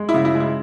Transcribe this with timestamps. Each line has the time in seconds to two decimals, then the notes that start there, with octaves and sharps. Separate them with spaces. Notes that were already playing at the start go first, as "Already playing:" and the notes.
Already playing: G#3
0.09 E4
0.14 C#3
0.25 E4
0.35 G#3
0.40 E4